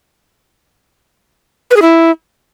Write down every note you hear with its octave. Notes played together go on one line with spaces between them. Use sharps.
B4
G#4
E4